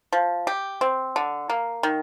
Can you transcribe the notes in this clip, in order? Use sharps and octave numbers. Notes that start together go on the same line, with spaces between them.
F3
G4
C4
D3
A#3
D#3